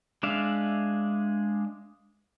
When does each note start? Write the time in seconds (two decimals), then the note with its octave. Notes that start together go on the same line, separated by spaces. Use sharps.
0.23 G#3 D4 D5 E5 F5